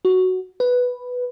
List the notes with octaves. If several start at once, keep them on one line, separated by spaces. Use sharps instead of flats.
F#4
B4